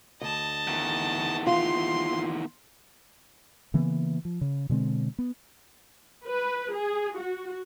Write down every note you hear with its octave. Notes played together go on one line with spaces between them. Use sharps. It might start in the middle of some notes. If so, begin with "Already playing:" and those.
D2 D#5 A5
E2 D#3
F4 C6
C#3 E3 A#3 B3
F3
C#3
B2 D3 G#3 C4
B3
B4
G#4
F#4